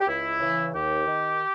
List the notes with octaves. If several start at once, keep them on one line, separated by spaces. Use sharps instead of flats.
G4
C#2 E4
C#3 E3
D#2 G4
D#3